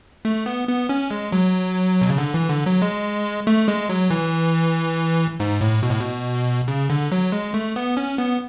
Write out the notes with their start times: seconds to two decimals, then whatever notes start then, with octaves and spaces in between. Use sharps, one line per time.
0.25 A3
0.46 B3
0.68 B3
0.89 C#4
1.11 G#3
1.32 F#3
2.02 B2
2.10 C#3
2.18 D3
2.34 E3
2.50 D3
2.66 F#3
2.82 G#3
3.47 A3
3.68 G#3
3.89 F#3
4.11 E3
5.40 G#2
5.61 A2
5.83 B2
5.91 A2
5.99 B2
6.68 C#3
6.90 D3
7.12 F#3
7.32 G#3
7.54 A3
7.76 B3
7.97 C#4
8.18 B3